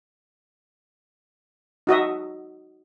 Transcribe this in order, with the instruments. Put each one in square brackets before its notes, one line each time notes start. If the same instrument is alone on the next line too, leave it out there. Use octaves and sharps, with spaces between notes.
[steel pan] D#4 F#4 D#5 E5